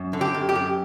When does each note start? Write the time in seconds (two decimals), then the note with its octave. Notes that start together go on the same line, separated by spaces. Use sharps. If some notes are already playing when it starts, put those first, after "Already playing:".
Already playing: F#2
0.13 D3
0.21 G4
0.34 F#2
0.49 G4
0.56 F#2